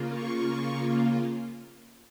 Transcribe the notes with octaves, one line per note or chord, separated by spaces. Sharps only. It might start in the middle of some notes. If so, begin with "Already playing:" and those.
Already playing: C#3 A#3 F4
C#6